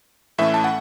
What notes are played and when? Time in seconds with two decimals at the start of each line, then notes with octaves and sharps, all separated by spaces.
0.38 A2 E3 A3 C#4 E5
0.54 A5
0.64 F#5